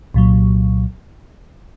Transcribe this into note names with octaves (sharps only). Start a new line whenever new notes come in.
C2 A#2 F#3